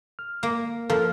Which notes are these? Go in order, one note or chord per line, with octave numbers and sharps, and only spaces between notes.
F6
A#3
F3 F4 A4 A#4